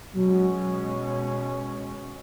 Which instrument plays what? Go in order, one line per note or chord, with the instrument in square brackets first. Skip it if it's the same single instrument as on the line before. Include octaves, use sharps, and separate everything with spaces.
[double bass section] B2 G#3 C#4 [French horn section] F#3